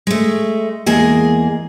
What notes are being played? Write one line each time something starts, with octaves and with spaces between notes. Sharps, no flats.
G#3 A3
E2 G#3 A#3 G#4 D#5